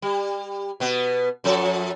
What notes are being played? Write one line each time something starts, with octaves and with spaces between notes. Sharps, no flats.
G3
B2 B3
F#2 F3 A4